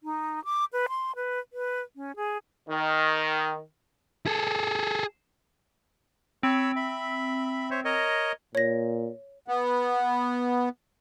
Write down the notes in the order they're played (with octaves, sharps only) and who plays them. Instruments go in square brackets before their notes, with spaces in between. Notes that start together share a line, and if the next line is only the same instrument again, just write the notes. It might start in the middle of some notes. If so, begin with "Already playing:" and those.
[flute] D#4
D6
B4
C6
B4
B4
C#4
G#4
[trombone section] D#3
[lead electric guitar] G#4 A4
[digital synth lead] C4 [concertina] C#5 B5 E6
[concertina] E5 B5
C5 C#5 E5
A#4 C#5 D#5
[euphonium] A#2 [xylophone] C#5 A#6
[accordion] B3